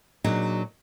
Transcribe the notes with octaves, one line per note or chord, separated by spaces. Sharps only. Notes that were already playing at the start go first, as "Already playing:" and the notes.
A#2 F#3 D4 D#4 F#4 G#4